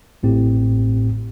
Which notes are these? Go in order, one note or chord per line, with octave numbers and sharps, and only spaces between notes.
A1 A2 C4 G4